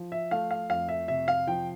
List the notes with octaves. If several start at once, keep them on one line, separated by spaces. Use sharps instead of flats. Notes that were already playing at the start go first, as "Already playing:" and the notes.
Already playing: F3
E5
A3 F5
F5
F2 F5
E5
C3 E5
F5
F3 G5